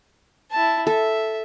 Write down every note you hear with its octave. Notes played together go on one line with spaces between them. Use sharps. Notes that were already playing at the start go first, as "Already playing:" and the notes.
E4 A5
A4 E5